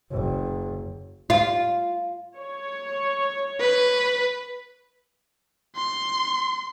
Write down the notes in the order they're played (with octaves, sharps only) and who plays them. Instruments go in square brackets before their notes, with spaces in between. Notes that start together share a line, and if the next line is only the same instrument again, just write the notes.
[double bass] F#1
[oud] F4
[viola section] C#5
[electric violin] B4
C6